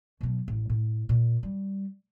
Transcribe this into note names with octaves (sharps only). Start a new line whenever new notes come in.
B2 F#3
A1
A2
A#2
G3